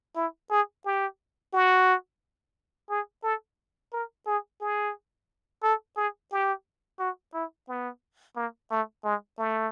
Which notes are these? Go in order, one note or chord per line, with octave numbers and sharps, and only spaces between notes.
E4
G#4
G4
F#4
G#4
A4
A#4
G#4
G#4
A4
G#4
G4
F#4
E4
B3
A#3
A3
G#3
A3